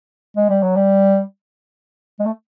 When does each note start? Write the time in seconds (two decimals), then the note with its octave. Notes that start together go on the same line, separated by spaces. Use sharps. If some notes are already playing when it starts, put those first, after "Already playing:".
0.37 G#3
0.49 G3
0.62 F#3
0.76 G3
2.19 G#3
2.26 A3